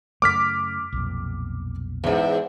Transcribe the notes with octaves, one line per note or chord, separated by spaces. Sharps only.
F#2 C#3 A3 D6 F6 B6
B1 F2 A#2
E2 G#2